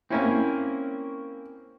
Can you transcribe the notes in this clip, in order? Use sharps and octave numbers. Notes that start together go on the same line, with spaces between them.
A#3 C4 C#4 E4